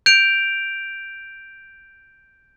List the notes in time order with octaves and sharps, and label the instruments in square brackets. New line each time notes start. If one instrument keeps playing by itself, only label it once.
[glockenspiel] G6 D7 F7